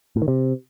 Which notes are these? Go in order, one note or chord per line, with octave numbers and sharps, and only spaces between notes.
A2
D#3
C3